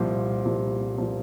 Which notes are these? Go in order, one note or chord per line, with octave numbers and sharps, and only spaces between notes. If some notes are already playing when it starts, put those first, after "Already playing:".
Already playing: C2 A#2 F3 C5
C2 A#2 F3
A#2 F3